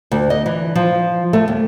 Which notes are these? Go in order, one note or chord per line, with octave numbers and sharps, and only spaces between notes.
D2
D#5
E3
F3
A3
D#2